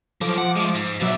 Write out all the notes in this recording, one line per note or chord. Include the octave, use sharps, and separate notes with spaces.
F3 F#3 A4 D6
F#5
G#3 A3
G#2
B2 F3 F#3 D5 E5